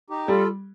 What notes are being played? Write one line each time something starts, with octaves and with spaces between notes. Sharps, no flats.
D#4 G4
G3 F4 A4